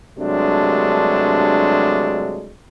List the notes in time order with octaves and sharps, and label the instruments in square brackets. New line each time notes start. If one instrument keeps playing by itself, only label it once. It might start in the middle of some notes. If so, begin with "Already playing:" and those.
[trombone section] G2 C3 F#3 G#3 A3 D4